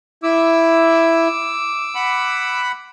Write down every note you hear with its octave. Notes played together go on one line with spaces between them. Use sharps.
E4 D6 E6
F#5 B5